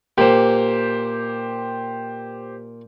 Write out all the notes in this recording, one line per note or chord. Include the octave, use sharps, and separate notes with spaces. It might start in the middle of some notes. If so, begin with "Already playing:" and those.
A#2 G4 C5